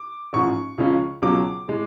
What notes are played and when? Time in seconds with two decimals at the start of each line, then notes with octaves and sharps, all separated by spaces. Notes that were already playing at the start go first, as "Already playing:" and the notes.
Already playing: D6
0.33 A1 G#2 F3 C#6
0.78 C#2 C#3 F3 G#3 C#4
1.22 C#2 B2 F#3 C#4 D6
1.68 A2 G#3